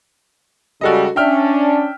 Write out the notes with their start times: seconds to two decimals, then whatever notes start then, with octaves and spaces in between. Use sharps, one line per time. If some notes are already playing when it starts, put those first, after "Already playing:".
0.81 C#3 G3 G#3 F#4 A4 D#5
1.16 C#4 D4 E5 G5 F6